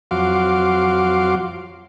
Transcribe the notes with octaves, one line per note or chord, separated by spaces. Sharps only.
F2 F#3 F#4 F5 C6 D6